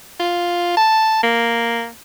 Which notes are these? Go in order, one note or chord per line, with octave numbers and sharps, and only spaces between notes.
F4
A5
A#3